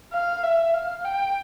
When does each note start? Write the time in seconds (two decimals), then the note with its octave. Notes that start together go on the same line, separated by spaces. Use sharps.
0.13 F5
0.43 E5
0.74 F5
1.04 G5